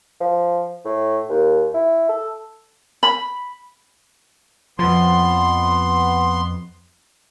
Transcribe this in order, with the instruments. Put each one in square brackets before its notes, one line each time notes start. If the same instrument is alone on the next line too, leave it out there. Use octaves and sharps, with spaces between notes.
[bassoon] F3
A2
D#2
E4
A4
[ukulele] B5
[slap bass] F2 F3 [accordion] B3 C6